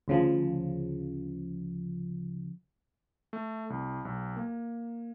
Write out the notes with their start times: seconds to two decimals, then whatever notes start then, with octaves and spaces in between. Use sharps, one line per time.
0.08 D2 C#3 F3
3.33 A3
3.70 C2
4.05 B1
4.37 A#3